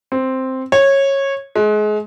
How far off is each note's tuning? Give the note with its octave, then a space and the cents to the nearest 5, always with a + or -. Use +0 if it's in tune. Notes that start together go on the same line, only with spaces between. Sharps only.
C4 +0
C#5 -15
G#3 +30